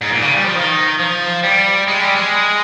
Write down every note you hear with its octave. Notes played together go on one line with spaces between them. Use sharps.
G#2
A#2
C#3
G3
F3
D#3
F3
G3
G#3
G3
G#3